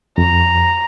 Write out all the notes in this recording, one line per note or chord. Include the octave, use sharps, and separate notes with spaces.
F2 A#5